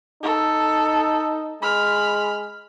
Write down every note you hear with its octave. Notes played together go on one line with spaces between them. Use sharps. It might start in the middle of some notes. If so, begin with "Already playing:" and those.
D#4 A4
G#3 B5 F6